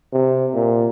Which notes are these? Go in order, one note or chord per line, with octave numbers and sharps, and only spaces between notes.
C3
A#2